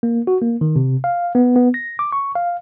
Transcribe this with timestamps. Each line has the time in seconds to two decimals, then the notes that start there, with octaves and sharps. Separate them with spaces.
0.03 A#3
0.27 F#4
0.42 A#3
0.61 D#3
0.76 C3
1.04 F5
1.35 B3
1.56 B3
1.74 A#6
1.99 D6
2.12 C#6
2.36 F5